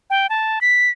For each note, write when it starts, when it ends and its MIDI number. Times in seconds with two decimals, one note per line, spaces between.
0.10 0.27 79
0.30 0.59 81
0.61 0.90 95